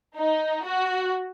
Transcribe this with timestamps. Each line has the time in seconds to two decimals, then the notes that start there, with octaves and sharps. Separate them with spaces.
0.17 D#4
0.65 F#4